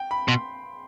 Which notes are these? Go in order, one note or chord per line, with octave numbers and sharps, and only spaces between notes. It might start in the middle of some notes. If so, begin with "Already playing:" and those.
Already playing: G5
B5
B2 C6